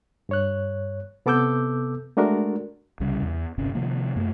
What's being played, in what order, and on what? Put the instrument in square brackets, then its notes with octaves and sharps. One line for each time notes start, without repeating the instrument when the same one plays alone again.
[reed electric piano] G2 C#5 F#6
C3 B3 A4 D6 E6 G6
G#3 A3 D4 F#4 A#4
[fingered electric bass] C2 C#3 G3
E2
D1 G1 C3 C#4
C3 D#3 F3 A#3
F#2 A3 A#3